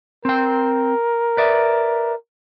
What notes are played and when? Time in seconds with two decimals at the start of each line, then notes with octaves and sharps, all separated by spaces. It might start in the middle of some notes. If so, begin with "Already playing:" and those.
0.25 C4 A#4 G5
1.37 B4 D5 E5